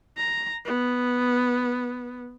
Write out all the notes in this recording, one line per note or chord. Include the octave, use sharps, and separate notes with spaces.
A#5
B3